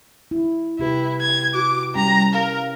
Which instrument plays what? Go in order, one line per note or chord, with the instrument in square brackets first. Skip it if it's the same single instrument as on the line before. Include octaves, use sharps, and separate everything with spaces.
[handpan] E4
[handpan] C3 G4 B4 [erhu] E4
[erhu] G#6
[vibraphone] F#4 [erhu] D6
[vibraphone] G3 [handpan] C#4 G4 [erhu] A#5
[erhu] A#4 [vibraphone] F5